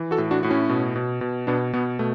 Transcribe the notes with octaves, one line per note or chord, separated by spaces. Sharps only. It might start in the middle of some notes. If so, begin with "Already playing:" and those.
Already playing: E3
F#4 A4
A2
D4 F#4
A2 F#4
C#4 E4
B2
B2
B2
B2 B3 D4
B2 B3
B2 A3